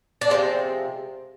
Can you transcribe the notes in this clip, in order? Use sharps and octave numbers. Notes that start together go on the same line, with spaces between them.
D4
C3 F3 G#3 C4